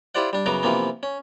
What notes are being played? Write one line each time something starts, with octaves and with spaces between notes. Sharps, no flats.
E4 F4 G4 C5 D5 F#5
G3 D4
F#2 C#3 B3 F#4 A#5 D6
C3 E3 F3 A#3 B3
C#4